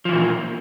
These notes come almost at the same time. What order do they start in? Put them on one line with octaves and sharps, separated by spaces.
F3 E3 A#2